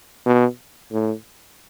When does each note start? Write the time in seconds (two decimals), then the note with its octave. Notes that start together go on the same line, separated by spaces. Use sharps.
0.26 B2
0.92 A2